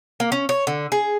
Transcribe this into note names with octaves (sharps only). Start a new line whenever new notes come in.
A#3
C#4
C#5
D3
G#4